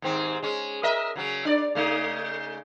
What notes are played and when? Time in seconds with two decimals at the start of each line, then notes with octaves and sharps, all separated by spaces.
0.02 D#2 G#2 C4
0.42 G#3 C#4
0.83 A#4 D#5 E5
1.16 C#3 F#3 C#4
1.45 D4 D5
1.75 C#3 A3 D#4